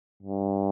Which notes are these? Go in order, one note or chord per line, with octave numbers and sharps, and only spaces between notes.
G2